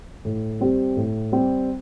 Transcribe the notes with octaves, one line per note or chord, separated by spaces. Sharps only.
A2
G3 C4 G4
A2
G3 C4 G4